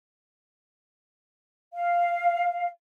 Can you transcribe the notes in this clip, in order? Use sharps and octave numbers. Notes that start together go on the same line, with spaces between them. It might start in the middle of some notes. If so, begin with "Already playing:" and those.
F5